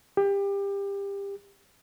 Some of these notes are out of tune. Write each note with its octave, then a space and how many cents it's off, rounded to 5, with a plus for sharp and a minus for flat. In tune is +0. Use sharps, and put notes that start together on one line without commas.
G4 +25